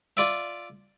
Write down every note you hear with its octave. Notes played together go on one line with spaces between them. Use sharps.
F4 D5 E5